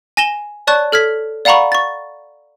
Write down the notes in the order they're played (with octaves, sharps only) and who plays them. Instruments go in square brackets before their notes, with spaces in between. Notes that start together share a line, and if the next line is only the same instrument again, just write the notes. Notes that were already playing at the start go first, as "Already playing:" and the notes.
[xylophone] G#5 A#6 E7 G7
C#5 D5 A5 C#6 F#6
A4 F6 G#6 B6
D5 F5 F#5 A#5 B5 C#6
C#6 A6